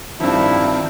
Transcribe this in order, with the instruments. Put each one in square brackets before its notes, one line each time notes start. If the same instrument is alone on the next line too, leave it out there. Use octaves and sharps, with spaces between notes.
[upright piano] G2 F3 [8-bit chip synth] D#3 C4 [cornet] E4